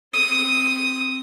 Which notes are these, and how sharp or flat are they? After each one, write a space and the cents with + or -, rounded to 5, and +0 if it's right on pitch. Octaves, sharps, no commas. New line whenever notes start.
C4 +0 D#6 +0